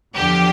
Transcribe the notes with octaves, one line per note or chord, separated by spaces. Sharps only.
E2 D3 F3 G4